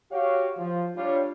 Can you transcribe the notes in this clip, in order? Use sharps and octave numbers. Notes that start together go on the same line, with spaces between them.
F#4 G4 C#5 F5
F3
G3 D4 F4 C#5